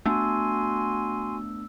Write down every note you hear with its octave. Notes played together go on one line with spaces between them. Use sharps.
A3 B3 D4 F#4 G#5 C6 E6